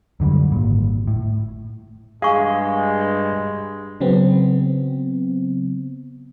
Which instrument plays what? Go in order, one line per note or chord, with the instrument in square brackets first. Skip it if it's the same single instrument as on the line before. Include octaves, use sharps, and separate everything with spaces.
[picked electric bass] F#2 D3 E3 G3
G#1 A#2
A2
[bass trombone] G2 [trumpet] G#3 [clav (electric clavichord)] G#4 [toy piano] F5 C#6
[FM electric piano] C#3 F#3 B3 C4